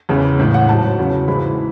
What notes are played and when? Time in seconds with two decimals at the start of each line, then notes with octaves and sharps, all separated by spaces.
0.09 E2 C#3 E3 G#3
0.39 A2 G#3
0.54 F#5
0.69 G#2 F#3 A5
0.99 E2 C#3 F#3
1.27 G#2 E3 G#3 B5